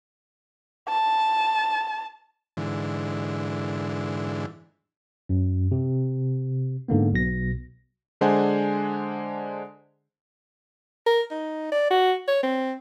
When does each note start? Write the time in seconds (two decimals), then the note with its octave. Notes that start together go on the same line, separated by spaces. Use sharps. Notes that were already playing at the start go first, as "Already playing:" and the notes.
0.89 A5
2.57 G#2 D3 E3
5.29 F#2
5.72 C3
6.88 G#2 D3 A#3 B3
7.13 B1 B2 A#6
8.21 D3 G#3 D4 C5 F#5 G#5
11.07 A#4
11.31 D#4
11.72 D5
11.91 F#4
12.28 C#5
12.43 C4